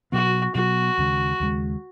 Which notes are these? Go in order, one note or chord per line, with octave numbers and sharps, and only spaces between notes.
B2 F#3 B3 F#4
B2 F#3 B3 F#4
D#2 C#3 G#3
D#2 C#3 G#3